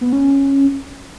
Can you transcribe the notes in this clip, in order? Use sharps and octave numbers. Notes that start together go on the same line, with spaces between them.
B3
C#4